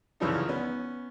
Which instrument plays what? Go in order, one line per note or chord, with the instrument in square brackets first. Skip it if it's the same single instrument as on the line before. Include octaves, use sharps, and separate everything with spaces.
[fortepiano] C2 C#3 E3 F3 C#4 D#4
B3 C#4